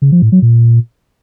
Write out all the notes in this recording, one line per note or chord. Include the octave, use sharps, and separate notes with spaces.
C#3
F3
A2
F#3
A#2